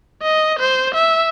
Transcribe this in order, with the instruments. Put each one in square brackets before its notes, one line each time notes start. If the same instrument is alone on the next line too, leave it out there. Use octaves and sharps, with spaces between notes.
[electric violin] D#5
C5
E5